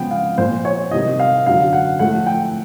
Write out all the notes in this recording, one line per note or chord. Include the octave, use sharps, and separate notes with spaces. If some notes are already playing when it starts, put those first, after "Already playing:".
Already playing: C#3 F3 G#3 B3 G5
F5
A#2 F3 A#3 C5
C#5
C3 D#3 G3 D#5
F5
F#2 D3 F#3 F5
F#5
A2 F3 A3 F#5
G5